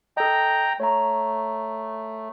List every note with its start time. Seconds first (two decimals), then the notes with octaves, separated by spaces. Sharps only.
0.17 A4 D#5 G5 A#5
0.80 A3 C#5 A#5